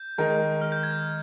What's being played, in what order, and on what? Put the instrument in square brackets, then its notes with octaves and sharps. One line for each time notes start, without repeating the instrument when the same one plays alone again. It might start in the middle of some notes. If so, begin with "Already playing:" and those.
Already playing: [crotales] G6
[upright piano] D#3 G#3 D#4 A#4
[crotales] F6
G6
G#6